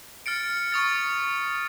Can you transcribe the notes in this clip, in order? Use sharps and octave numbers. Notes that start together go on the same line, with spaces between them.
F6 A6 C#7 D7
C#6 D#6 A6